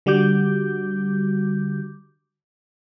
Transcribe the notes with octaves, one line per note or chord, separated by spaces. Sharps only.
D3 G3 F#4 D6 G6